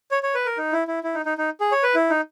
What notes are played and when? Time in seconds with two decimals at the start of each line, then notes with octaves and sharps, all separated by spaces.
0.11 C#5
0.23 C#5
0.35 B4
0.46 A#4
0.58 D#4
0.73 E4
0.88 E4
1.03 E4
1.15 D#4
1.26 D#4
1.38 D#4
1.60 G#4
1.72 C#5
1.83 B4
1.95 E4
2.10 D#4